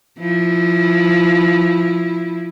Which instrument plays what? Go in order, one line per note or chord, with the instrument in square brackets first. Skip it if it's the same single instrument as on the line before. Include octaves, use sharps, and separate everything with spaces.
[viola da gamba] F3 E4